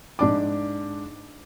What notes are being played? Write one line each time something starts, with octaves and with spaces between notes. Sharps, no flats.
G#2 D4 D6